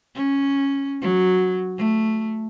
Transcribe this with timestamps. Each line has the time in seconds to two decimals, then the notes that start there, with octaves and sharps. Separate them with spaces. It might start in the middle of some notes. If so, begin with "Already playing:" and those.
0.15 C#4
1.01 F#3
1.78 A3